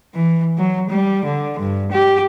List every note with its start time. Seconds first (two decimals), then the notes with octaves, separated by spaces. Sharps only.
0.15 E3
0.58 F#3
0.90 G3
1.25 D3
1.59 G2
1.92 G4